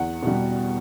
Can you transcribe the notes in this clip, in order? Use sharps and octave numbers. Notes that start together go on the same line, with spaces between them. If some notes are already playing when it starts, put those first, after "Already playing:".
Already playing: E2 F#5
B2 G3